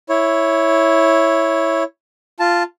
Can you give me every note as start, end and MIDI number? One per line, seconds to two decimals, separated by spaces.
0.09 1.83 64
0.09 1.83 73
2.39 2.63 65
2.39 2.63 81